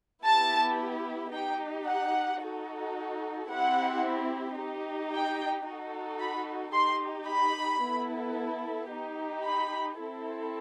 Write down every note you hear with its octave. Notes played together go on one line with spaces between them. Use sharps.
B3 E4 G4 A5
D#4 G4 G5
F#5
D#4 F#4 A4
C4 E4 G4 F#5
D#4 G4
G5
D#4 F#4 A4
B5
D#4 G4 C6
B5
B3 E4 A4
D#4 G4
B5
C4 E4 A4